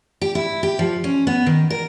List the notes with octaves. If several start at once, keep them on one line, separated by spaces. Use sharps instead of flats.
G4
E4
G4
F3
C#4
B3
D#3
A#4